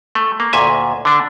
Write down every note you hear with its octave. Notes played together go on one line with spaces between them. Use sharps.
A3
A#3
D2 A#2 E5 G#5
D3 D4